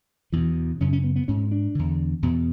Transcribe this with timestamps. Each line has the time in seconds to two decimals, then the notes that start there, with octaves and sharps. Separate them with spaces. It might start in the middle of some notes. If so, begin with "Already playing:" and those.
0.32 E2 B2 E3
0.81 F#2 C#3 C#4
0.93 C#4
1.04 B3
1.16 B3
1.28 G#2 C#4
1.51 D4
1.75 E2 D3
2.22 E2 B2